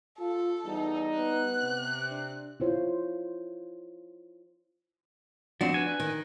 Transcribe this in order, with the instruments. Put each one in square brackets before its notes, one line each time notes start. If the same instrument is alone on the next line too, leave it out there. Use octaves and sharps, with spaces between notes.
[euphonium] F4 [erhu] A4
[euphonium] E2 [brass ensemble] G3 D#4
[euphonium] B3 [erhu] F#6
[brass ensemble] C3
[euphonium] D4
[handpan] E4 F4 C5 C#5
[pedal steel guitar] F3 C4 [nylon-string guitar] D4 F#4
[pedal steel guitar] B4 G#5
[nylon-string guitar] D#3